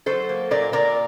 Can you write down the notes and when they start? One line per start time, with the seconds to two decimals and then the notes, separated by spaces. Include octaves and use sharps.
0.06 F#3 A4 C5
0.29 A#3
0.51 A#2 A#4 D5
0.73 A#2 A#4 D5